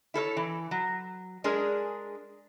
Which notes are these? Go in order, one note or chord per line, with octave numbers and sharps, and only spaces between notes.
E4 A4 A#4 C#5
E3
F#3
G#3 D4 G#4 A#4